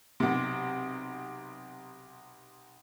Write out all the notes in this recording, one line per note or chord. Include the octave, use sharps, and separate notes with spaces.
B1 C3